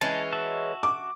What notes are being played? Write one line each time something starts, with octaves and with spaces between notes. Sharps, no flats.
E3 G#3 C#4 A5
F#4 E5 A5
D6